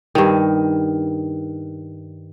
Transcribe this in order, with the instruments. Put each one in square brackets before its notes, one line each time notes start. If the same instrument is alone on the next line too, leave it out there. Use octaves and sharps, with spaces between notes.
[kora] G2 D#3